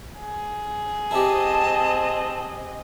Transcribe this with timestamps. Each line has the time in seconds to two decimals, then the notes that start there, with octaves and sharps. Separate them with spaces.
0.20 G#4
1.11 C4 E4 G4 D#5 A5